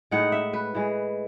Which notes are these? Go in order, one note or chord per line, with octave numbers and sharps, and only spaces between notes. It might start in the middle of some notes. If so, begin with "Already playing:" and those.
A2 G#3 D#4 F#5
E5
B4
A2 E3 G#3